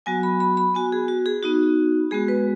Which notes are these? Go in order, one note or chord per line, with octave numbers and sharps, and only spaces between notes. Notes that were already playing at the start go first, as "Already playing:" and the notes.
F#3 B3 F#4 G#5
B5
B5
B5
B3 F#4 G#5
G#4
F#4
G#4
B3 D#4 F#4
G#3 B3 F#4 G#4
B4